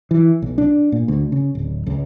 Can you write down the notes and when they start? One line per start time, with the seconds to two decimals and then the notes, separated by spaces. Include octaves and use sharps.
0.11 E3
0.42 B1
0.58 D4
0.92 A#2
1.08 D2
1.32 C#3
1.55 D1
1.86 C#2